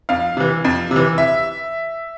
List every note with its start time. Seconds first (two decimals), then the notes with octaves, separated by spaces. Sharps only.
0.09 F2 F5
0.37 C3 E3
0.64 F2
0.91 C3
0.96 E3
1.18 E5